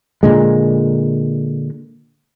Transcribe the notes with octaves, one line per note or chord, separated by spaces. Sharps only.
A#2 D3 G#3